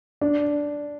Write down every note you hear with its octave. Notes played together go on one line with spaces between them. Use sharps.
D4